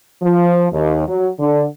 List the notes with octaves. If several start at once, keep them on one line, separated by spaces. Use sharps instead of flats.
F3
D#2
F#3
D3